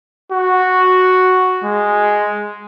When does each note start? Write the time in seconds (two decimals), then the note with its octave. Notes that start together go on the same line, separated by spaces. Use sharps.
0.32 F#4
1.64 G#3